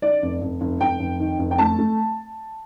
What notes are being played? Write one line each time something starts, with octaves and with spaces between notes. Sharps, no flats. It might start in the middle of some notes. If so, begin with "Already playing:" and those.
D#3 D5
F1
F1
F1
F1 G5
F1
D#3
F1
G5
A3 A5
A3